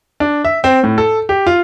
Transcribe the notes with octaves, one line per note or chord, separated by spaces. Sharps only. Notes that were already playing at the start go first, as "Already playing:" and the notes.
D4
E5
C4
A2
A4
G4
F4